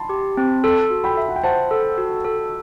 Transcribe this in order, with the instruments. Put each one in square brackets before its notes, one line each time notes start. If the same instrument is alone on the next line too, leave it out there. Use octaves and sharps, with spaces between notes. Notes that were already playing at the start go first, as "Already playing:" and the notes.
Already playing: [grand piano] A5 B5 C6
[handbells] G4
C4
[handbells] A4 [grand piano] A5 C6
[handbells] F#4
[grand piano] G5 B5
[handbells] E5
[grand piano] F#5
G5
[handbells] C5 [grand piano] F#5 A5
[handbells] A4
F#4
A4